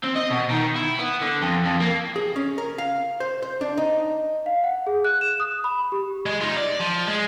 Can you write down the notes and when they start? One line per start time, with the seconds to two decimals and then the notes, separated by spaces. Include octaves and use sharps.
0.04 C4
0.16 D#5
0.31 B2
0.51 D#3
0.76 E4
0.99 B3
1.22 D3
1.42 F2
1.66 F2
1.80 A#3
2.16 G#4
2.36 C#4
2.58 A#4
2.78 F5
3.20 C5
3.42 C5
3.61 D4
3.77 D#4
4.46 F5
4.64 F#5
4.87 G#4
5.04 F#6
5.21 E7
5.40 D#6
5.64 B5
5.92 G4
6.26 G#3
6.41 D#4 F4
6.57 D5
6.80 F3
7.08 G#3